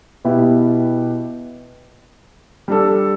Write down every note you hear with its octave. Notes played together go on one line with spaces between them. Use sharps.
B2 B3 E4 G4
G3 D4 A4